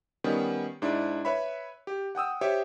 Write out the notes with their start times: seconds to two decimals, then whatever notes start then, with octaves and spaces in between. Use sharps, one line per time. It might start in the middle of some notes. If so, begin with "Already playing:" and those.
0.24 D#3 G3 B3 C#4
0.82 G#2 D4 E4
1.25 B4 C#5 E5 B5
1.87 G4
2.15 F#5 G5 D#6 E6
2.41 G4 C5 C#5 E5